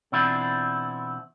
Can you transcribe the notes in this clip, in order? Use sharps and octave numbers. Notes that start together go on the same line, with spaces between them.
B2 E3 C4 D4 E4 F4